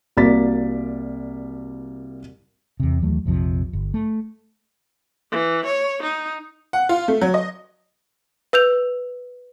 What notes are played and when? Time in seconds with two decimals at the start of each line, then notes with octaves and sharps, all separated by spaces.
0.17 C2 A#3 F#4 D5 A6 B6
2.80 E2 C3
3.02 D#2 E3 F#3 A3
3.26 A#1 F2 C3 F3
3.73 G1
3.94 A3
5.32 E3
5.66 C#5
6.03 D#4
6.73 F#5
6.89 F4
7.08 A3
7.22 F#3
7.34 D#5
8.53 B4 E6 G6 F7